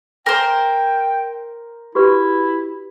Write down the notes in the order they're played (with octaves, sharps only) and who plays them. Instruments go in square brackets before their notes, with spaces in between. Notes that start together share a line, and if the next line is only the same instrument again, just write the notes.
[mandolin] A#4 C5 [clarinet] G5 [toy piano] G#5
[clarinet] E4 [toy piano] F#4 G4 B4